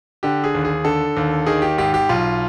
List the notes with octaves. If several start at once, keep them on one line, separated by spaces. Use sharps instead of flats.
D3 G4
G#4
D#2
G#4
D3 A4
D#2
D#3 G#4
G4
G#2 G4
G4
B1 F4